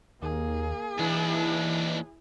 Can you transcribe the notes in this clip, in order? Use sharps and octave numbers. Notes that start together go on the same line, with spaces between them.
D#2 A#3 G#4
D#2 E3 D4 E4